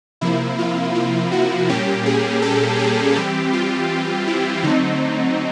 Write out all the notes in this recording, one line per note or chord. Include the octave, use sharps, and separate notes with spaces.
C3 F3 A#3 E4
F4
F4
F#4
A#2 G3 A#3 C#4 G4
G#4
A4
G#4
E3 G3 C4 G4
F4
E4
D3 F#3 A3 C4 D#4